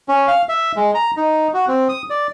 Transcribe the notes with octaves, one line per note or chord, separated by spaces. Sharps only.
C#4
F5
E5
G#3
A#5
D#4
F#4
C4
D#6
D5